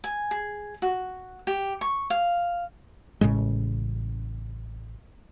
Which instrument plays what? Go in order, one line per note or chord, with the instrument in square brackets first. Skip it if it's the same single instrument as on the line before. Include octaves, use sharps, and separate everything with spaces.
[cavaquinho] G#5
G#4
F#4
G4
C#6
F5
[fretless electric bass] A1 A2 C#3 G#3